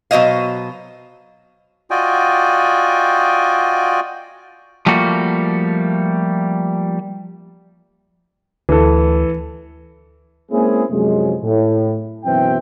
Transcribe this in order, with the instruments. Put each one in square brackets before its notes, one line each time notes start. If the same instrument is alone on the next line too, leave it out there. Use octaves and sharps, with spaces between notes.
[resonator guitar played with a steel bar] B2 F#3 C5 D#5 F5
[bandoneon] F4 F#4 D5 D#5 G5 G#5
[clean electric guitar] F3 G3 A3 A#3 F#4
[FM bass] D2 [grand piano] E3 A4
[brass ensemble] G#3 A#3 C4 C#4 E4 G#4
F#2 C3 F3 F#3 G#3
A2
F#2 B2 E3 C4 E5 G5